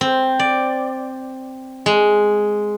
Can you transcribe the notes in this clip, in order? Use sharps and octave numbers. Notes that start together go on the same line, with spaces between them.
C4
D5
G#3